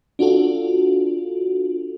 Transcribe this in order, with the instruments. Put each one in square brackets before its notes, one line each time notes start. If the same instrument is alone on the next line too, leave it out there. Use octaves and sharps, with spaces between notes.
[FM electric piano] D4 F4 F#4 A4